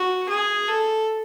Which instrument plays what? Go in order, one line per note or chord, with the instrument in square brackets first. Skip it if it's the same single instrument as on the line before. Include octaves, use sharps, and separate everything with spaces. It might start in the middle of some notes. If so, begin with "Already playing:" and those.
Already playing: [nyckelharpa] F#4
G#4
A4